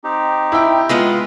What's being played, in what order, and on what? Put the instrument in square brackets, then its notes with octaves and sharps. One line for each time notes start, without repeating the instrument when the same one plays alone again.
[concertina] C4 D#4 G4
[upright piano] E4 G5
[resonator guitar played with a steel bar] G#3 B3 F4